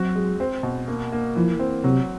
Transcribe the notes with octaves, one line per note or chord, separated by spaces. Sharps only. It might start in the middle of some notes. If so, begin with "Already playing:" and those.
Already playing: F#3 C4 F#4
G#3
C4
B2
A#3
A#3
E3 F3
C4
C3 F#3